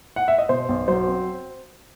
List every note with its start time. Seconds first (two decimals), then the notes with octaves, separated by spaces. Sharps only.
0.16 F#5
0.28 E5
0.38 D#5
0.49 B2 C5
0.69 B1
0.88 F#3 C5
1.07 C4